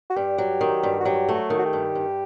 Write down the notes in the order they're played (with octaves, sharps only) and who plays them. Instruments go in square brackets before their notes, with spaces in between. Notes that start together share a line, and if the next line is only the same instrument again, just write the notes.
[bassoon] F#4
[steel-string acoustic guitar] G2 [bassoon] G4
[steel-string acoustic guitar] F#3
D#3
G2
[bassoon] F#4
[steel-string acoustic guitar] F#3 [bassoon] G4
[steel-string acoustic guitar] A3
[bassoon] F#4
[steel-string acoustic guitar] D#3
[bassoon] F#4
G4
[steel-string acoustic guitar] G2
G2